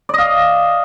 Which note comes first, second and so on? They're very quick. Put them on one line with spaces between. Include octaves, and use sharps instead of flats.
D5 D#5 F5